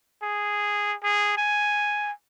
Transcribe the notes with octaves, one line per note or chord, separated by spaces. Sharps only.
G#4
G#4
G#5